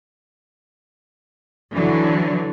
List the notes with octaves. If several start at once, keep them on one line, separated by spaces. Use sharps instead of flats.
D3 E3 F#3